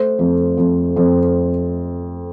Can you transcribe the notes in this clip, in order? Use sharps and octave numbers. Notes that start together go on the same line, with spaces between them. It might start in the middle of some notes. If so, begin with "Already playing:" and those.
Already playing: A3 C5
F2
F2
F2